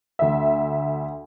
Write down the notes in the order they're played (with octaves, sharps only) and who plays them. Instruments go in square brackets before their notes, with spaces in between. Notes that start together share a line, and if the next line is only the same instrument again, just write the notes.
[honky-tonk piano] D2 E5